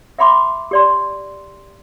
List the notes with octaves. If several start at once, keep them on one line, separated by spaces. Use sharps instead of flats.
E5 F#5 B5 C6 D6
G4 D5 C6